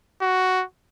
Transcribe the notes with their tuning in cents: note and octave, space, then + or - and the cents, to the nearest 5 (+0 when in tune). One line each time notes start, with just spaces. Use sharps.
F#4 +5